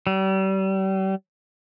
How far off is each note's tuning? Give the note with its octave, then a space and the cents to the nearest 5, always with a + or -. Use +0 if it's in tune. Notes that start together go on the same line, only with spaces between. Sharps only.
G3 -35